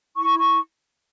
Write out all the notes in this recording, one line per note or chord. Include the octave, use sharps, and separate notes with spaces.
E4 C#6
C#6